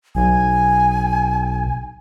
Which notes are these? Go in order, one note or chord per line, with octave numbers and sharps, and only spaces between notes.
B1 G#5